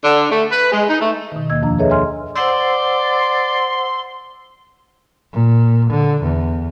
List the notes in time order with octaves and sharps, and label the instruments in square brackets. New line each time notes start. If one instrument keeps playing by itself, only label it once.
[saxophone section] D3
A3
B4
G#3
D#4
A3
[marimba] B2 D#3
D#2 A#3 D#5 E6 G#6
F2 F3 D4 A#5
G#4 A4 B4 C#5 D#5 E5
D#5 E5 G#5 C6 F6
[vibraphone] C5 F#5 E6 [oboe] D5 [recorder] C6
[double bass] A#2
D3
E2